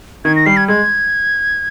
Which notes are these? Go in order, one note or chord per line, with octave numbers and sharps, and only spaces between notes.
D#3 G#6
A#6
G3 C7
G#6
G#3 G#6